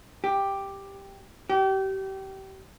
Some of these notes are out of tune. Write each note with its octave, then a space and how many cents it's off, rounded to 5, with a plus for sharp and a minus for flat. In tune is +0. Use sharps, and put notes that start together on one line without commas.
G4 +5
G4 -30